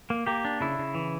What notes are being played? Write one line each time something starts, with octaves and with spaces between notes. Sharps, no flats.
A#3
A#3 G4
D4
C#3 E4
C#3
E3